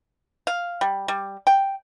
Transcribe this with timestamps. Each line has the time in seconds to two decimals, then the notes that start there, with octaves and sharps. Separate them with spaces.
0.47 F5
0.81 G3
1.08 G3
1.47 G5